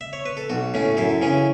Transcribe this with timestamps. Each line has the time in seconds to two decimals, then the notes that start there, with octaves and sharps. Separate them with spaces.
0.01 E5
0.13 C#5
0.26 B4
0.37 A4
0.50 B1 F#4
0.74 A2 A3 C#4
0.97 F#2 E4 A4
1.22 C#3 E3 C#4